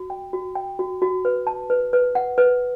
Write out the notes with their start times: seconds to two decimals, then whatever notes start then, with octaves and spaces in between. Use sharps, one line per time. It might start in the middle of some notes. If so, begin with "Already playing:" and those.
Already playing: F#4
0.10 G5
0.33 F#4
0.55 G5
0.79 F#4
1.02 F#4
1.25 B4
1.47 A5
1.70 B4
1.93 B4
2.15 F#5
2.38 B4